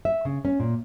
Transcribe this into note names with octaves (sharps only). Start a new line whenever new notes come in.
E5
C#3
C#4
A#2